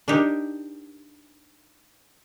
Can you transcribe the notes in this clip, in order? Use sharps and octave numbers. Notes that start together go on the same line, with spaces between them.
D4 D#4 G4 A#4